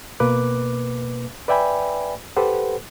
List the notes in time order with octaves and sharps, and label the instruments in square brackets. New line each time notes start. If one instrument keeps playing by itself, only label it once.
[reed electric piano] B2 A#3 B4 D6 F#6
B4 D5 E5 G5 G#5 B5
G4 A4 B4 C5 F#5